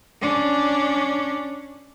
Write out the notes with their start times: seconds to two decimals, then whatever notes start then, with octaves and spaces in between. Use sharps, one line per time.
0.21 C#4 D4